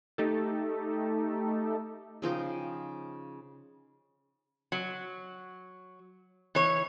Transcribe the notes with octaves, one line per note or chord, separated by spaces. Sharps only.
A3 D#4 G4 A4
C#3 F3 D#4 G5
F#3
E3 C#5